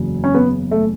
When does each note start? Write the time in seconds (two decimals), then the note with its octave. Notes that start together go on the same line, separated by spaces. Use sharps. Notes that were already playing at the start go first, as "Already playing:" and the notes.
Already playing: F#1 E2 C#3 F#3
0.24 C#4
0.34 B3
0.71 A3